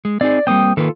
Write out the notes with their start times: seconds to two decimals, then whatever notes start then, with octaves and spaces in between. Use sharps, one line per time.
0.05 G#3
0.21 C4 D#4 G#4 D5
0.47 G3 A#3 C4 G5 D#6
0.77 D#3 A#3 F4 A4 B4